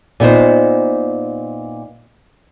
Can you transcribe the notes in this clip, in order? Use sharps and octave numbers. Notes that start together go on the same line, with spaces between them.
A#2 B3 D#4 C5